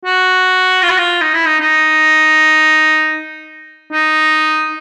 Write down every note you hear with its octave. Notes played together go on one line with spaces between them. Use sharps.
F#4
F4
F#4
F4
D#4
E4
D#4
D#4
D#4